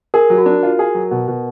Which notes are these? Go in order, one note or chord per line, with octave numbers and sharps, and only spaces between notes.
G#4 A#4
F#3
F#4
D4
F4
G#4
F#3
B2
B2